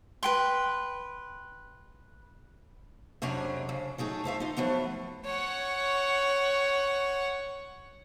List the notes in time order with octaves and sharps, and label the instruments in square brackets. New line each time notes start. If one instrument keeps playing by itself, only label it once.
[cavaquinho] B4 G5 C6
[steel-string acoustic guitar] F2 C3 F#3 C#4 D4
F2 C#3
F#3 A3 D#4 G#4
F2 F4 E5 F5
D#4 F4
F3 F#3 A3 B3
[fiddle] C#5 F#5